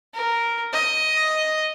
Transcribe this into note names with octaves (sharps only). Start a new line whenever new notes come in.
A#4
D#5